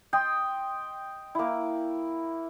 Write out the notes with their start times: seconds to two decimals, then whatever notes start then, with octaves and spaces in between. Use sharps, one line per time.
0.13 D#5 G5 C6
1.35 A#3 E4